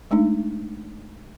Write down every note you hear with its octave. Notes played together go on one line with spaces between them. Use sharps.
G#3 A3 D4 D#4